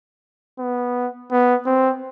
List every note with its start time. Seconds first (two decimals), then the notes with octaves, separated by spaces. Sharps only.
0.59 B3
1.31 B3
1.66 C4